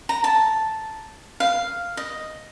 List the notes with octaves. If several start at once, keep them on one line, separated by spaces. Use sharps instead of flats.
A#5
A5
F5
D#5